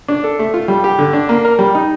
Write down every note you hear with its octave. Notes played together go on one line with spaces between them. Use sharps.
D4
A4
A3
F4
G3
G4
D3
D4
A#3
A#4
G3
D#4